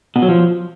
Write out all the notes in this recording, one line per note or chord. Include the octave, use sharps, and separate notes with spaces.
B2
F#3
F3